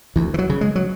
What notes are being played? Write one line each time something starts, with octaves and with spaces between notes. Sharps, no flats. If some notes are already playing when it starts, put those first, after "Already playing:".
D2 E3
E3
F#3
C#3
G#3
F#3